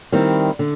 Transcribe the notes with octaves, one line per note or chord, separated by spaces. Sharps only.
D#3 G3 C4 E4
D3